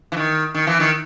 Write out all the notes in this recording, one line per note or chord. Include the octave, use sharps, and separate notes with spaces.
E3
D#3
D#3
E3
D#3